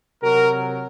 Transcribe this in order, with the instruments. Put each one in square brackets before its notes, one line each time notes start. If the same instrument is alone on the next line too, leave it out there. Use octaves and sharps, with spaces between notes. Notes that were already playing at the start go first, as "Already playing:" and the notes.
[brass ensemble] C3 F#3 F#4 A#4